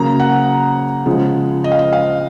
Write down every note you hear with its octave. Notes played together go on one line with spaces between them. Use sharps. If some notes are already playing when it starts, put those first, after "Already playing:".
Already playing: C#3 F#3 A#3 A#5
F#5
C#3 F3 G#3
D#5
F5
D#5
F5